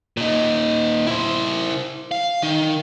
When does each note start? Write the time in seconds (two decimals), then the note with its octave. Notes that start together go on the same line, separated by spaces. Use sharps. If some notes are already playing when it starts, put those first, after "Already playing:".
0.17 A#2 D#4
1.07 E4 C5
2.11 F5
2.42 D#3 D#4